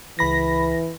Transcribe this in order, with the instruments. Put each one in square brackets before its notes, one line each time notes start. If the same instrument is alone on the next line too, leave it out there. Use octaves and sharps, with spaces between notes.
[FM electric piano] C#2 B5 A#6 [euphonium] E3